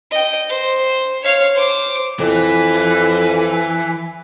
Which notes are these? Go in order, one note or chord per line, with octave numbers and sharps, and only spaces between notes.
D#5 G5
C5
C#5 F5
C5 D6
F2 E3 B4